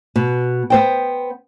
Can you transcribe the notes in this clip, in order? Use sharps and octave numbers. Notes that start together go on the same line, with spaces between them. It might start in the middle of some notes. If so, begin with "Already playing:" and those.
B2
B3 C5 G5